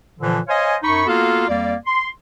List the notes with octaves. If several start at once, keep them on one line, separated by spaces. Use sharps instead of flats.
A#2 D3 E3 F3
C5 C#5 D#5 F5 G#5
F#2 D#4 B5 C#6
A#3 B3 F4 F#4 A4 F5
F2 G3 A#3 D5
C6